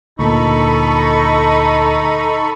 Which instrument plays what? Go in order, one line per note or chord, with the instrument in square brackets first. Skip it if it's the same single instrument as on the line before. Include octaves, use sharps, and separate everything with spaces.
[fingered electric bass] D2 A#2 [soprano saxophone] D#4 [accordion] A4 B5 C#6